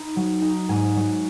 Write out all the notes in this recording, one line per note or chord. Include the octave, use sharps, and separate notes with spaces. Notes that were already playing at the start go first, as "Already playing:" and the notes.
Already playing: D#4 B5
F#3
D#4
G#2 G#5
F#3